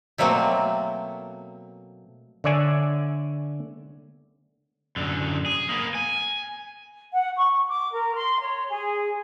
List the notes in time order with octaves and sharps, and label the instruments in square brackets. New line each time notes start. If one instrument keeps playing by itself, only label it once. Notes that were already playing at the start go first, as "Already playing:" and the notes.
[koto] B2 F#3 A3 A#3 C4
[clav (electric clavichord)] D3 C#5 D5 E5 G#5
[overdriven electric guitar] F#2 D3
G#4
A#3 B3
G#5
[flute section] F#5
C#6
D6
A#4
C6
C#5
G#4